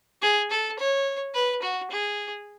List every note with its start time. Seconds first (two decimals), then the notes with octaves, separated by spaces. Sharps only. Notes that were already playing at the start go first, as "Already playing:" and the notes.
0.22 G#4
0.51 A4
0.79 C#5
1.34 B4
1.62 F#4
1.90 G#4